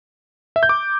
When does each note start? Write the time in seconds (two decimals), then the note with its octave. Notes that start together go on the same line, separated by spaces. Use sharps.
0.56 E5
0.63 G6
0.69 D6